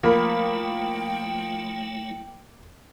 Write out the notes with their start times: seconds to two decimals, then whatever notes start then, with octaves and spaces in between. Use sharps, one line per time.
0.03 F3 F#3 A3 A#3 E4 G5 B5